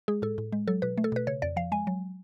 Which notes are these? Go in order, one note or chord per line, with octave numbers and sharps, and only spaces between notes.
G#3 G#4
A2 A4
A2
G#3
F#3 A4
B2 B4
A3
A4
B2 B4
C#3 C#5
F2 D5
F3 F5
G#3 G#5
F#3